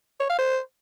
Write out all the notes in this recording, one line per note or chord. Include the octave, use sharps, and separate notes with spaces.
C#5
F5
C5